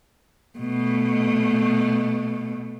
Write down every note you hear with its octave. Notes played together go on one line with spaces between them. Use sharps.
B2 A3